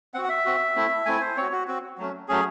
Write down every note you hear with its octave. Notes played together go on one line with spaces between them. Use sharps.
C4 F#4 F#5
F#5
E5
C4 F#4
A3 C4 E4
A3 C4 E4 G#5
C5
C4 F#4 C#5
F#4
C4 F#4
F#3 A3 C#4
F#3 A3 C#4 G#4